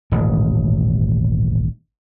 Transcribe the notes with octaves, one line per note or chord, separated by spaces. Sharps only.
D#1 A1 G#2